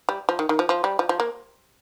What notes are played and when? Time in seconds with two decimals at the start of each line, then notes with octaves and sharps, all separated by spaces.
0.09 G3
0.29 F3
0.39 D#3
0.49 D#3
0.59 F3
0.69 F3
0.84 G3
0.99 F3
1.09 F3
1.20 A#3